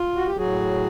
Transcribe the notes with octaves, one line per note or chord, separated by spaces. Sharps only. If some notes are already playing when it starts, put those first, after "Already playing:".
Already playing: F4
F#4
G4
A2 F#3 F#4 G#4